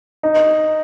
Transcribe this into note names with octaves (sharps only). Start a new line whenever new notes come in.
D#4